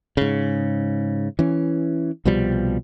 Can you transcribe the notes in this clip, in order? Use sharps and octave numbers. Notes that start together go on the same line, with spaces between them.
G#2 C#3
E3 C#4
C2 B2 F3 G3